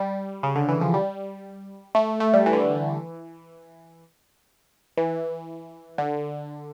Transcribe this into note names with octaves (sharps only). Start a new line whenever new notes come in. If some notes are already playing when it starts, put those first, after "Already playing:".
Already playing: G3
C#3
D3
E3
F3
G3
A3
A3
G3
E3
D3
E3
E3
D3